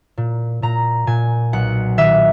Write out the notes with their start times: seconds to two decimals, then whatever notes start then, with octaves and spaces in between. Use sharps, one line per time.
0.17 A#2
0.62 A#2 A#5
1.07 A#2 G#5
1.53 B1 F#5
1.97 D#3 E5